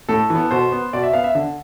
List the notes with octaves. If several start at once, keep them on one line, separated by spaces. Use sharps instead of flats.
A2 A4
E3
B3
B2 C5
B3
B2 D5
E5
B3 F5
E5
D3